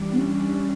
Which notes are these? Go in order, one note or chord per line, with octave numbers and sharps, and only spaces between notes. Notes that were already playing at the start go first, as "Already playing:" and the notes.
Already playing: E3 G3 D4
B3
C#4